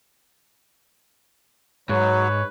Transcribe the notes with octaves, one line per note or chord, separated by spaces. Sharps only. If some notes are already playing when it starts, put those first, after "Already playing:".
G#2 F#3 B4 C#5